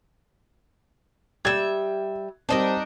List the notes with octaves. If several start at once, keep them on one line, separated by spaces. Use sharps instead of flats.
G3 E5 G#6
G3 C4 D4 D#4 A#4